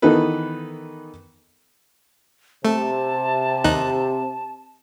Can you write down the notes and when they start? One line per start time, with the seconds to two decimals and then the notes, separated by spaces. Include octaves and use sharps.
0.02 D#3 E3 B3 D#4 A4 B4
2.65 C3 A3 A5
3.64 D#2 D#4 F#6